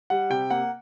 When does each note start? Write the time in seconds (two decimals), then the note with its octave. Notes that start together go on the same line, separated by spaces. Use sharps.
0.10 G3 F#5
0.30 C3 G5
0.50 A#3 F#5